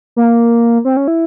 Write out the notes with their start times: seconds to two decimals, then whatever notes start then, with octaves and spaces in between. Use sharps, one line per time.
0.16 A#3
0.85 C4
0.97 C#4
1.08 E4